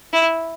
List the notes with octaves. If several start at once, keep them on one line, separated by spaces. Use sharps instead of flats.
E4